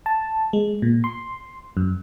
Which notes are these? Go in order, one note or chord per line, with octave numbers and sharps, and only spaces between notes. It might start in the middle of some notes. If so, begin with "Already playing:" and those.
A5
G#3
A#2
C6
F#2